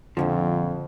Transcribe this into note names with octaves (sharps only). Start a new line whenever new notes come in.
F2 A#2 D3 F3